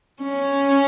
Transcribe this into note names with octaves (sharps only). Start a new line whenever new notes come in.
C#4